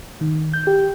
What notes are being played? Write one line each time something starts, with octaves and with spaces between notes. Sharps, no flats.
D#3
G6
G4